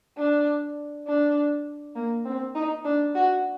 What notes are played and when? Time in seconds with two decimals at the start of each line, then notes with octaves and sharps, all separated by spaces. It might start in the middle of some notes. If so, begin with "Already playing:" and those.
0.18 D4
1.08 D4
1.95 A#3
2.25 C4
2.55 D#4
2.85 D4
3.15 F#4